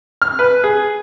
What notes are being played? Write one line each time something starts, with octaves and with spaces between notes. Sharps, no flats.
F6
B4
G#4